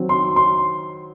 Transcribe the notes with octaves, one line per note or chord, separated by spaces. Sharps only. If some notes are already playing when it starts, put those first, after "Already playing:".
Already playing: D#3 F#3 C4
C6
C6